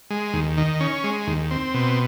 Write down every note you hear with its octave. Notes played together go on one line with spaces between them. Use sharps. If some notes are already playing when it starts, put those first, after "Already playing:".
G#3
D#2
D#3
C#4
G#3
D#2
C4
B2